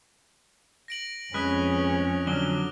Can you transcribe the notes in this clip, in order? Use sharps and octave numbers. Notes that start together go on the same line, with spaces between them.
A#6 D7 F#7
F2 G#3 C#4 B4 D#6 F#6
D3 F#3 D4 F6 G7